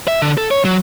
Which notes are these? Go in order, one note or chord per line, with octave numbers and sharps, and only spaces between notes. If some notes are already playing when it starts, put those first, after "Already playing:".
E5
D3
A4
C#5
F#3